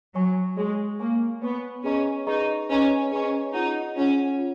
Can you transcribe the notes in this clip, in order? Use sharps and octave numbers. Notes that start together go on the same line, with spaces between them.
F#3 C#5 G#5 C#6
G#3 C#5 G#5 C#6
A#3 C#5 G#5 C#6
B3 C#5 G#5 C#6
C#4 G#4 B4 D#5 A#5 C#6
D#4 G#4 B4 D#5 A#5 C#6
C#4 G#4 B4 D#5 A#5 C#6
C#4 G#4 B4 D#5 A#5 C#6
D#4 F4 G#4 C#5 F#5
C#4 F4 G#4 C#5 F#5
F4